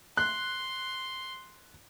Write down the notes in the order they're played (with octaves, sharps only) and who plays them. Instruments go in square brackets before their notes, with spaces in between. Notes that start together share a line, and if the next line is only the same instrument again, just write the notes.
[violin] C6 [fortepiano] F#6